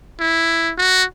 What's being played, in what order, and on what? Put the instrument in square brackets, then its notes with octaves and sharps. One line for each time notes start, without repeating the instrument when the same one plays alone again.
[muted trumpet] E4
F#4